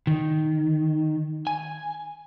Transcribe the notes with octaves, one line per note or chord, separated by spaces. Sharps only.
D#3
G#5